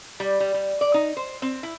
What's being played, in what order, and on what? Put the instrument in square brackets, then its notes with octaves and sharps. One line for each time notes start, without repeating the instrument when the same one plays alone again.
[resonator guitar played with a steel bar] G3
G3
G3
D5
D#4
C5
C4
E4